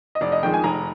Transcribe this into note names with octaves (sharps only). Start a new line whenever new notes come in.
D#5
F1 D5
D#5
F2 D#3 G#3 G5
G#5
F1 A#5